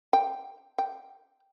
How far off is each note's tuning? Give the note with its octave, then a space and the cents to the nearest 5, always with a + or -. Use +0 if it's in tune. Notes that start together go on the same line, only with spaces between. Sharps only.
G5 +0
G5 -5